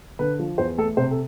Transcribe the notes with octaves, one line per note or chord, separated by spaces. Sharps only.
D3 B4
F3
E2 C5
A3 A4
C3 C5
A4